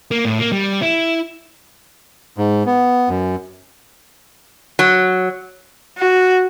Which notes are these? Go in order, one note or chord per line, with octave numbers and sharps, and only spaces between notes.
A#3
A2
A#3
G3
E4
G#2
B3
F#2
F#3
F#4